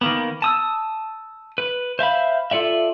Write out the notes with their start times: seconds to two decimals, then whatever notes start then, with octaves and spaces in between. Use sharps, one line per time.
0.01 D#3 A#3 B3
0.42 A5 D#6 E6
1.58 B4
1.99 C5 E5 F5 B5
2.51 F4 A4 D5 E5